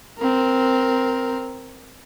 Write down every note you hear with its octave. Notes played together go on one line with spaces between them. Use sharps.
C4 A#4